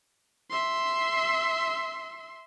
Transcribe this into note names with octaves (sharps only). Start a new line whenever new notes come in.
E5 C6